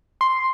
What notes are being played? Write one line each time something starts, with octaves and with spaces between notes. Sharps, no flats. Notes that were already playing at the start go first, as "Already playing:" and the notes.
C6